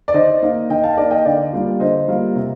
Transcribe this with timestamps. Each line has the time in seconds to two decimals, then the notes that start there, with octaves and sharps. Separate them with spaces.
0.08 D5
0.14 D#3 C5 D#5
0.42 A#3 D#4
0.70 D#3 D#5 G5
0.84 F5 A5
0.93 D#5
0.97 A#3 D#4 A#4 D5
1.11 D#5 G5
1.25 D3 D5 F5
1.53 G3 A#3 F4
1.80 D3 C5 D#5
2.08 G3 A#3 F4
2.35 C3